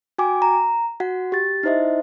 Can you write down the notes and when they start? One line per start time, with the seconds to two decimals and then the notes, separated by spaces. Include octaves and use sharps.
0.18 F#4 G5 G#5 D6
0.42 A#5
1.00 F#4 F#5
1.32 G4 A6
1.63 D#4 E4 C5 D#5 E5